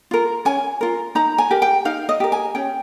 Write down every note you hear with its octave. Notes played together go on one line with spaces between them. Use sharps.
F4 A#4
C#4 G#5
F4 A#4
D#4 A#5
G#5
G4 A#4
G5
D#4 F5
D#5
G4 A#4
G#5
C#4 G5